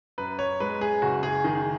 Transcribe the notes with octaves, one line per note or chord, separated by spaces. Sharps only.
F#2 B4
C#5
G#3 B4
G#4
F#1 F#4
G#4
D#3 G#4